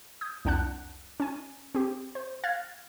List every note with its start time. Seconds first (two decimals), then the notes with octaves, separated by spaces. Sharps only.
0.21 D#6 G6
0.45 C2 F2 D4 F#5 A5 F#6
1.20 C#4 G#5
1.75 C4 G4
2.15 C5
2.44 F5 F6 F#6 G#6 A6